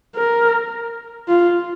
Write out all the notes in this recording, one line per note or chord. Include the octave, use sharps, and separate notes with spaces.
A#4
F4